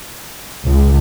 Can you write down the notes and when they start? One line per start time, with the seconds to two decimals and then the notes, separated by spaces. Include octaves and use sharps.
0.67 C#2